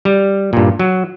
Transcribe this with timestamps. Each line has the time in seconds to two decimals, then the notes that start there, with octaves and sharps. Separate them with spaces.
0.05 G3
0.53 G2 A#2
0.79 F#3